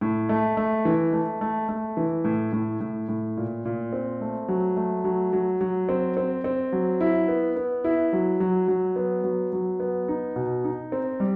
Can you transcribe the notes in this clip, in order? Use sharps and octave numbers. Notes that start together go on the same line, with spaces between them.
A2
A3
A3
E3
A3
A3
A3
E3
A2
A2
A2
A2
A#2
A#2
C4
A3
F#3
A3
F#3
F#3
F#3
C4
C4
C4
F#3
E4
B3
B3
E4
F#3
F#3
F#3
B3
F#3
F#3
B3
D#4
B2
D#4
C4
G3